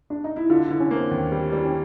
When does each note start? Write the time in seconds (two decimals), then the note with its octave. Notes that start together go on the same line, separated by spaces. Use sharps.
0.10 D4
0.24 D#4
0.36 E4
0.49 D3 F4
0.66 D3 E4
0.80 C#4
0.91 A#3
0.96 C4
1.11 D#2
1.32 G3
1.52 G3
1.64 C#4